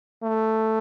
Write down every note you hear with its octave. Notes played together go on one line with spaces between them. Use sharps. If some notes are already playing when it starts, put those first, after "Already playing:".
A3